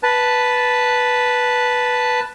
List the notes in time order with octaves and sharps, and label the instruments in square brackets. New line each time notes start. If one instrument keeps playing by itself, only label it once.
[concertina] B4 A5